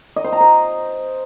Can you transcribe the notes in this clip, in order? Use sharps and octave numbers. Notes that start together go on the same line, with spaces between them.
D#5
C5
A#5
C5